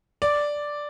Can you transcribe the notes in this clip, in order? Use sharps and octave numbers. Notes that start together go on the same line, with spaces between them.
D5